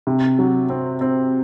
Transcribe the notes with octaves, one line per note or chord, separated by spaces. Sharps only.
C3
F#3
C4
C4